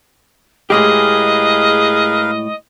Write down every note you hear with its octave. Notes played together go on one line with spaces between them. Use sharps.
A2 G#3 G4 G#4 A#4 B4 D#5 F5